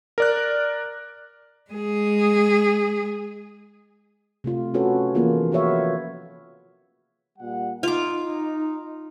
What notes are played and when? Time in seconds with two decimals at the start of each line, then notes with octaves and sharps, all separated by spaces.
0.18 A#4 D5 F#6
1.71 G#3 G#4
4.44 C3 A3 F4
4.74 A3 C#4 F#4 A4 B4 C#5
5.15 E3 F3 A#3 B3 F4 G#4
5.52 F4 F#4 B4 C#5 E5 F5
7.39 A#2 G3 F#5
7.83 D#4 F4 D6
8.24 D#4